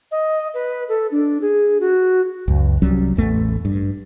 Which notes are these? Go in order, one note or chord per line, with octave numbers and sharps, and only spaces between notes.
D#5
B4
A4
D4
G#4
F#4
C#2 F#2
C2 F#3 G3 C#4
A1 E2 A3
G2